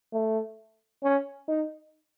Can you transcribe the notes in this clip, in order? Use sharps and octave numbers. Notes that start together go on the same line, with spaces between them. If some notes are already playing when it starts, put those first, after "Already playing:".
A3
C#4
D#4